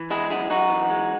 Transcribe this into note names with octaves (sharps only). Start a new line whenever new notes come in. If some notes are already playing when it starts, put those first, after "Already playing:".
Already playing: E3
G#3 E4 G#4
F#2 E4 G#4
F#2 D#4 F#4
E3
G#3